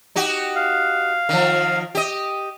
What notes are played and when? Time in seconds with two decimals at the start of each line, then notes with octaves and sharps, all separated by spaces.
0.16 D#4 F#4 G4
0.56 F5
1.29 D#3 F3
1.95 G4 D#5